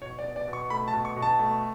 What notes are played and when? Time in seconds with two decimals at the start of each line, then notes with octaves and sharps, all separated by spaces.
0.02 B2 C#5
0.19 D5
0.24 B3
0.36 D5
0.47 B2
0.53 C#6
0.70 A3 B5
0.88 A5
0.93 B2
1.05 C#6
1.16 B2
1.22 A5
1.39 A3